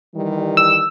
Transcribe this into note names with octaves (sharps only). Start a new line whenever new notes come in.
D#3 E3 G3
E6